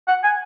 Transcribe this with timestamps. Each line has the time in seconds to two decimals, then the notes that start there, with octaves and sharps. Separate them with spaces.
0.08 F#5
0.23 G#5